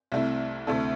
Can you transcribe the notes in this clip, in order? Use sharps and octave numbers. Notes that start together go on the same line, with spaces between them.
C2 C3 A3 E4
D2 C3 A3 E4 A4